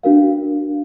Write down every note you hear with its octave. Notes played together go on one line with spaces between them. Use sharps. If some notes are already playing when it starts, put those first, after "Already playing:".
D4 F#4 A#4 F5